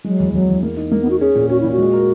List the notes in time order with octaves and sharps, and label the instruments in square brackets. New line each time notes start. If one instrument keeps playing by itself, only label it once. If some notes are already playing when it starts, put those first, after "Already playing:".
[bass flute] F#3 [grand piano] G#3
[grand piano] E2
[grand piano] E2 [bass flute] F#3
[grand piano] E2
A#3
D#4
[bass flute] G#3 [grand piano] A#3
[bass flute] B3
[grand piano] D#4 [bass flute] F#4
[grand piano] C#4 [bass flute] G#4
[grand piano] A#2
[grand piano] C#4 [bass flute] F#4
[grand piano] A#2 [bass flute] E4
[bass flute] F#4
[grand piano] G#3
A#4